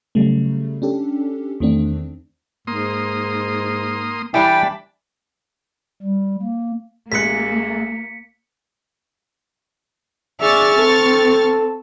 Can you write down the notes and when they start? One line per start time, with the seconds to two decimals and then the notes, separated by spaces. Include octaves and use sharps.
0.15 C#3 F#3 G3 A3
0.82 C#4 D4 G4 A4
1.60 E2 D#3 A3 C4 D4
2.67 G#2 A#3 C6 D#6
4.34 E3 G3 D4 G5 A5 B5
6.03 G3
6.42 A#3
7.12 A1 G#3 A#3 F#6 B6 C#7
10.41 G#4 D5 E5 C#6 F6 A6
10.79 C4 A4